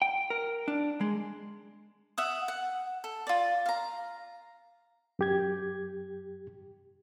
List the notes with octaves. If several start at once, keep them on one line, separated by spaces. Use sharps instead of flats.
G5
A#4
D4
G#3
E5 F#5 D#6
F#5
A4
F4 D5
F5 A#5
F#2 G4 G#6